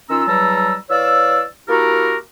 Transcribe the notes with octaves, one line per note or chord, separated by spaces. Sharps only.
D#3 C#4 F4 A#5 E6
E2 F#3 G3 A5 A#5 E6
E3 C#5 D5 F5 E6
A#3 E4 F#4 G4 A4 A#4